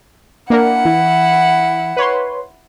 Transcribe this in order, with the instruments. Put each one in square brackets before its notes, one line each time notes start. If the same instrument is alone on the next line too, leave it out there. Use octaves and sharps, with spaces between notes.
[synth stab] A#3 D4 A#4 [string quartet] E4 F#5
[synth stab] E3
B4 C#5 C6